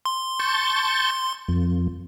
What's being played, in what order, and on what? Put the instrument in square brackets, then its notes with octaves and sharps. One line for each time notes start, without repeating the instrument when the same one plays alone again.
[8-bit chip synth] C6
[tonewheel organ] A5 C#6 G6
F2